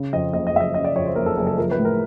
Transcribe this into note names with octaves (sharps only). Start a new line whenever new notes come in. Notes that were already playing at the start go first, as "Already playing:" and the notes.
Already playing: C#3
F2 D#5
F#1 D#5
D#5
F#1 E5
D#5
C#3 D#5
D5
F2 C#5
C5
F#1 A#4
A4
F#1 G#4
A4
F3 A#4
B4
A2
A#4